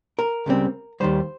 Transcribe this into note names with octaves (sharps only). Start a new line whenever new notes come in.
A#4
C#2 C#3 G3 C4
D#2 D#3 G3 C5